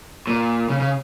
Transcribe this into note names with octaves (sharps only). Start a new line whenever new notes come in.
A#2
C#3
C#3